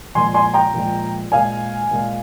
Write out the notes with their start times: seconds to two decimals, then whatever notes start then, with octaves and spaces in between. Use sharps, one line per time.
0.15 A#2 F3 G#3 G#5 C6
0.34 G#5 C6
0.54 G5 A#5
0.74 A#2 F3 G#3
1.32 A#2 G#3 F5 G#5
1.91 A#2 G#3